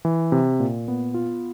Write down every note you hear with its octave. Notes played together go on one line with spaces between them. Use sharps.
E3
C3
A#2
B3
F4